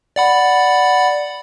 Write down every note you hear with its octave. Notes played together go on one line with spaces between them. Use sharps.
D5 F#5 B5